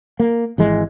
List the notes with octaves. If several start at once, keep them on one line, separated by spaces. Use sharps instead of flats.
A#3
G#1 E3 G#3